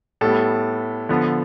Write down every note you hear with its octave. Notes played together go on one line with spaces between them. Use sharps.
A2 G3 B3 A4
D3 F3 B3